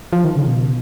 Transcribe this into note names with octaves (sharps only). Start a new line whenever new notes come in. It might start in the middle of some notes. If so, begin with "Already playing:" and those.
F3
D#3
C#3
B2